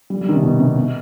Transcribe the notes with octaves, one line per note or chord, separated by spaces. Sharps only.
G3
G3
D#3
C3
B2
C3
B2